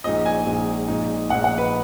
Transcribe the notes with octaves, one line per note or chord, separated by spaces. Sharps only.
A#1 A#2 G#3 D#4 D#5
G#5
A#1 A#2 G#3 D#4
A#1 A#2 G#3 D#4
A#1 A#2 G#3 D#4 F#5
F#5
B4